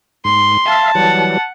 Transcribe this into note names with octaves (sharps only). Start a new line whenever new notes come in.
G#2 C6
E5 F5 A5
E3 F#3 G3 F#5